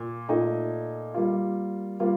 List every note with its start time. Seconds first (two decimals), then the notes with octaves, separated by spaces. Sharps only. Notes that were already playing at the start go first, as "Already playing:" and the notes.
Already playing: A#2
0.28 A#2 A3 D#4
1.14 G3 A#3 F4
2.00 G3 A#3 F4